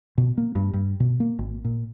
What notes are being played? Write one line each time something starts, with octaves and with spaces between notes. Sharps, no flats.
B2
A#3
G2
G2
B2
A#3
G#1
A#2